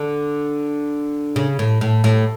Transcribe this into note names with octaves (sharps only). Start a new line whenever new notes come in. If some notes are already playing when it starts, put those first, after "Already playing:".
Already playing: D3
C#3
A2
A2
A2